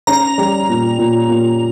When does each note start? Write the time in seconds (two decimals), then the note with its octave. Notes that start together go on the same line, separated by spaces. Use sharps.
0.07 C#4 A#5
0.38 G3
0.69 A#2
0.99 A#2
1.29 A#2